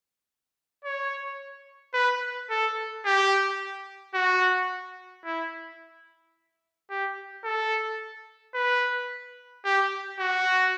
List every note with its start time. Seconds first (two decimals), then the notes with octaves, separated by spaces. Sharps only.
0.84 C#5
1.94 B4
2.50 A4
3.05 G4
4.14 F#4
5.25 E4
6.90 G4
7.44 A4
8.54 B4
9.65 G4
10.20 F#4